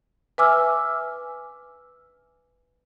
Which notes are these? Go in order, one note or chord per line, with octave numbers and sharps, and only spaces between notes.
B4 E5 G#5 D6 E6 F6